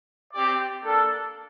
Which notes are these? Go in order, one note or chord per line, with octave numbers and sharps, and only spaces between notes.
C4 G4 D5
A#3 D4 A4